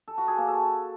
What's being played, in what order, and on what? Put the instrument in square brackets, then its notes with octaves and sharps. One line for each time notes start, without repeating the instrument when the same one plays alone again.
[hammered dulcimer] A4
F#4
G#4
A#3
A4